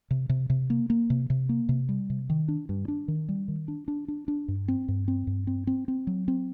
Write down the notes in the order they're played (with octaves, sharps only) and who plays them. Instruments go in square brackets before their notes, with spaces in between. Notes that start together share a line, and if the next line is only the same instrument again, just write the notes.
[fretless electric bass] C3
C3
C3
A#3
A#3
C3
C3
A#3
C3
G3
C3
D#3
D4
G2
D4
D#3
G3
D#3
D4
D4
D4
D4
G2
C4
G2
C4
G2
C4
C4
C4
F#3
C4